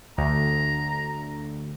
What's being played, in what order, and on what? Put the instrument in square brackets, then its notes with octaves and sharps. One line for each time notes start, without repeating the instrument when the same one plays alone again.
[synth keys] D2 [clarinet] A#5